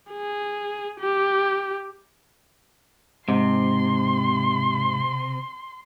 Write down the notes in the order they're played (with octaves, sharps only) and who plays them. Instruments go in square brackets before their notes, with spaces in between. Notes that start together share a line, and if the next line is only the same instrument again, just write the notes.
[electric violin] G#4
G4
[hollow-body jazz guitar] G#2 [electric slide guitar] C3 [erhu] C6